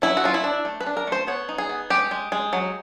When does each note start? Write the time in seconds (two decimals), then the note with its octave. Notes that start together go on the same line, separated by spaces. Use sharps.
0.02 F#3 E4
0.17 F#4
0.24 F#3 F4
0.34 E4
0.44 D4
0.65 A3
0.81 B4
0.86 D4
0.97 A#4
1.07 A3 C5
1.27 B3 C#5
1.49 D#4
1.58 G#4
1.69 B3
1.90 G#3 G4
2.11 G#3
2.32 G#3
2.53 F#3